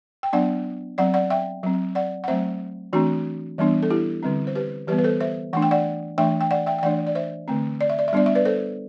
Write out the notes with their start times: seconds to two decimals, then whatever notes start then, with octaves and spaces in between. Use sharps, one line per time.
0.23 G5
0.33 F#3 B3 D4 D5 F#5
0.98 F#3 C4 D5 F#5
1.14 D5 F#5
1.30 E5 G5
1.63 F#3 C4
1.95 D5 F#5
2.24 F#5
2.28 F#3 A3 C4 C5 E5
2.93 E3 A3 C4 D4 F#4
3.58 E3 G3 B3 D4
3.83 A4
3.90 E4 G4
4.23 D3 G3 C4
4.47 C5
4.55 G4 B4
4.87 E3 G3 B3 G4 B4
4.98 B4
5.04 A4 C5
5.21 C5 E5
5.53 E3 A3 D4 F#5
5.62 G5
5.71 D5 F#5
6.18 E3 A3 D4 E5 G5
6.41 G5
6.51 D5 F#5
6.66 E5 G5
6.78 G5
6.83 E3 A3 D4 D5 F#5
7.07 D5
7.15 C5 E5
7.48 D3 A3 C4
7.81 D5
7.90 E5
7.99 D5
8.08 E5
8.13 G3 B3 D4 D5
8.26 E5
8.35 B4 D5
8.45 A4 C5